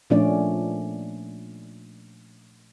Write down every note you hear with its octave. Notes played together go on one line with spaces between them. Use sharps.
A#2 F3 A3 C#4 D4 D5